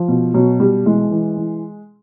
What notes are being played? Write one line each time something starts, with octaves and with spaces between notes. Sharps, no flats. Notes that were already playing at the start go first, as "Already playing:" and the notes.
Already playing: F3
B2
B2 F#3
B2 G3
E3 G#3
E3
E3